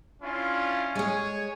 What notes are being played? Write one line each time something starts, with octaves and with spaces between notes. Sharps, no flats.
C#4 D4 E4 F4
G#3 G#4 C#5 G#5